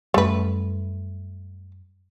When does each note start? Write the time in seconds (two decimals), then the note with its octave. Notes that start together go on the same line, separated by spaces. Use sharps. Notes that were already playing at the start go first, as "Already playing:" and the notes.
0.14 F#2 G3 A3 B4